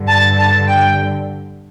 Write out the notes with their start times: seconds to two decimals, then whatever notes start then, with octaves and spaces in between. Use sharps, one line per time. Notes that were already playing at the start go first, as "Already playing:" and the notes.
Already playing: G2 D3
0.08 A5
0.37 A5
0.67 G5